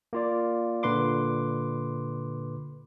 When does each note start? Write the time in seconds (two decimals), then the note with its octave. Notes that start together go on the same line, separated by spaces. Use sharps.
0.13 A#3 F4 D5
0.83 A#2 D3 B4 C6 D6